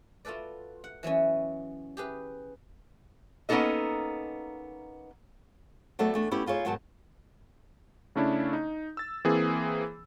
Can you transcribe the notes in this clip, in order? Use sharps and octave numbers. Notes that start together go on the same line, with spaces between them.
F4 F#4 A4 B4 D5
F#5
E3 F#3 B3 C#4
G4 G#4 B4
A#3 B3 C#4 D#4 A4 D#5
F#3 A3 B3 A4 D5 E5
E2 A3 D4
B3 C#4 E4 G4 B4
D#4 F4 G#4 C#5 E5
G#2 B2 D#3 F#3 F#4 A5
C#3 A3 C#4 D4 E4
D#4
E6 A6
E3 A#3 C4 G#4